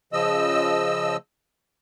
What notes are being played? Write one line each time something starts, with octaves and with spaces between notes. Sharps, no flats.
C#3 F3 D#5 E6